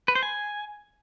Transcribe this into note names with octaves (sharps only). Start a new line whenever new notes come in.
B4
C5
G#5